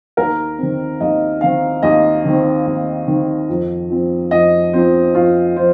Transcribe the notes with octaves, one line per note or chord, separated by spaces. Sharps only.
D#2 A#4
D#3 C4
D#2 D#5
D#3 C4 F5
D#2 D#5
D#3 C4
D#2
D#3 C4
F2
F3 C4
F2 D#5
F3 C4 C5
F2 F4
F3 C5